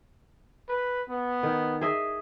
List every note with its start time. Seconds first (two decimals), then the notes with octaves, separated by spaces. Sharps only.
0.69 B4
1.09 B3
1.43 D#3
1.81 G#4 D#5 E5